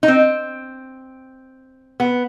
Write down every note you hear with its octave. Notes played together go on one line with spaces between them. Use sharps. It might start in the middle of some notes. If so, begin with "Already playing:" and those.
D#4
C4
B3